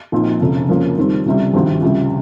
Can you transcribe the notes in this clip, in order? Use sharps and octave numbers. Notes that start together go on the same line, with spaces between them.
A#1 A#2 F3 C4 D#4
F1 F2 C#3
F2 C#3 F3 A#3 C#4
F2 D#3 G3 C4
C#2 C3 G3
G#1 G2 F3 C4 G4
C#2 C3 G3